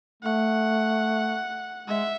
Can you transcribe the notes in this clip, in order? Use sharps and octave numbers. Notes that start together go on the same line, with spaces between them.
A3 F#5
G#3 E5